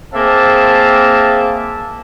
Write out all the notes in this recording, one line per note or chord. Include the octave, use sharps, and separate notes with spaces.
A#3 C4 G#4 E5 F5 A5